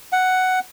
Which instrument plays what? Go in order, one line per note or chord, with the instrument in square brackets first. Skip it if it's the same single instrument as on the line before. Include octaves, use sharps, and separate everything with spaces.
[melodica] F#5